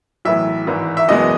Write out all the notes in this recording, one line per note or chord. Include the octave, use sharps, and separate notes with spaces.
B1 A2 E3 E5
G#1 G#2 E3
E5
F#1 E2 B2 G#3 D#5